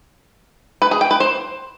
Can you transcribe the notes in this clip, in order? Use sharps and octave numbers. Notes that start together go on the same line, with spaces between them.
B4
G#4
G5
B4
C5